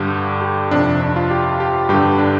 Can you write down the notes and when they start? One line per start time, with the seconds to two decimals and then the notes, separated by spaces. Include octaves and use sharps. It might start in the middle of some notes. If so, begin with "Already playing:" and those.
Already playing: G2 D3 G4
0.41 G4
0.71 F2 C3 D4
1.01 D4
1.16 F4
1.31 G4
1.60 G4
1.89 G2 D3 G4
2.18 D4